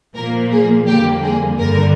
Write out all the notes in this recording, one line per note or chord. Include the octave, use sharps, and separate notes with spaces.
A#2 F3 A#3 A#4
G#4
F2 D3 G3 A#3 G4
G#4
G2 D3 G3 A#4